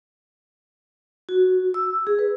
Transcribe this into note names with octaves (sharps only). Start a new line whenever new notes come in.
F#4
E6
G#4
B4